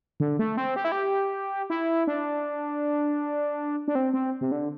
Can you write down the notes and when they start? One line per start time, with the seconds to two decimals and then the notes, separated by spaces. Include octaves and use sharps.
0.20 D3
0.39 A3
0.57 C4
0.76 G4
0.84 E4
0.92 G4
1.70 E4
2.07 D4
3.88 D4
3.95 C4
4.13 C4
4.41 C3
4.52 D3